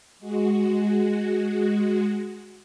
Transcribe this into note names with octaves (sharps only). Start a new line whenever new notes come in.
G#3 F#4